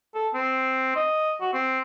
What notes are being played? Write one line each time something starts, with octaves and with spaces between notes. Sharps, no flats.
A4
C4
D#5
F#4
C4